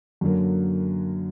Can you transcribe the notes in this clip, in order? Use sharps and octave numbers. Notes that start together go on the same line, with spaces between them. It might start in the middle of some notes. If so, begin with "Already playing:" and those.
F#2 D3 F#3 A#3